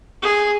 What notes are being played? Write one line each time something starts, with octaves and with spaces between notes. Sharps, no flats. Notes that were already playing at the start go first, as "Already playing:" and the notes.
G#4